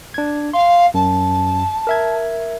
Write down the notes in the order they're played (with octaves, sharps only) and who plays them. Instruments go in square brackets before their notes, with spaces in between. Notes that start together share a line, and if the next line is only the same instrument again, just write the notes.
[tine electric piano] D4 G#6
[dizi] F5 [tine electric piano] C6
[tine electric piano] F#2 [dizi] A5
[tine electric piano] A#4 E5 G#6